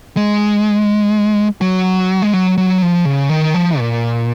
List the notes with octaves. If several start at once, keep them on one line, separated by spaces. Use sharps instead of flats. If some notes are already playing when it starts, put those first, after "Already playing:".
G#3
F#3
G#3
F#3
F#3
F3
C#3
D#3
F3
A#2